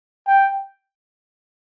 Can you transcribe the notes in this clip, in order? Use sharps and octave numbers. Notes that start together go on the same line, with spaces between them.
G5